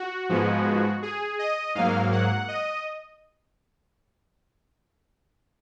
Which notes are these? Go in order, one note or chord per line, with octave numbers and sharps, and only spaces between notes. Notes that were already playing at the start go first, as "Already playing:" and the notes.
Already playing: F#4
G#2 F3 G#3 B3
G#4
D#5
G#2 F#3 A#3 F5
F#5
D#5